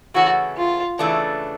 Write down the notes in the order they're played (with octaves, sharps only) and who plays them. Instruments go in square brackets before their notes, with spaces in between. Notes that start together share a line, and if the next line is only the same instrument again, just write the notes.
[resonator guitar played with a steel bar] C#3 E3 A3 C#4 [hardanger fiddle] F#4
[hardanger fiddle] F4
[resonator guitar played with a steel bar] C#3 E3 A3 D4